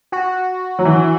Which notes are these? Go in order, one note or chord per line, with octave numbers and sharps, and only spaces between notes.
F#4
F#3
E3